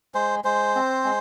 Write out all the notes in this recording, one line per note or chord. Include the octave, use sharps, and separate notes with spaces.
G#3 C5
G#3 C5
C4
G#3